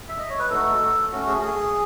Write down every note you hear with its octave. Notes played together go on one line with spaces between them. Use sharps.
E5
D#5
C#5
B4
A3 D#4 F#4 A4
A3 C#4 F#4
G#4
G#4